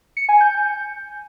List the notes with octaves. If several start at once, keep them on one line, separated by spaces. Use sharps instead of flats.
C#7
G#5
G6